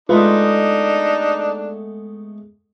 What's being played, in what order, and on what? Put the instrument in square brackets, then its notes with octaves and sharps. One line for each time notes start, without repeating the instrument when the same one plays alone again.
[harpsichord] G#3 A3 B3 [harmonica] D4 D#4 [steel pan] F4 B4